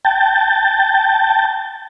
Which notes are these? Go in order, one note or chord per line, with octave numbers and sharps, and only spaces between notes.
G5 A5